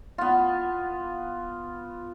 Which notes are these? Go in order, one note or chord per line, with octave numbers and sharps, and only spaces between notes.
B3 F4